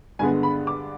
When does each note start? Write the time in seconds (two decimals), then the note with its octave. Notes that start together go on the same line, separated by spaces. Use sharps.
0.19 G2 D3 G#3 B3 G#5
0.43 B5
0.67 D6